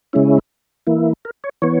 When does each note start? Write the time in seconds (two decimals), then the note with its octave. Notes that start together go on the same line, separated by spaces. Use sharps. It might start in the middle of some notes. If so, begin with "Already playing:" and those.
0.13 C#3 G#3 C#4 E4
0.87 E3 A#3 E4
1.25 A#4
1.44 C#5
1.62 E3 B3 C#5